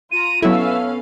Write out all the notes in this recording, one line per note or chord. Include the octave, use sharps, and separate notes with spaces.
F4 A#5 D#7
F#3 B3 C#4 E4 A4 B4 E5 F5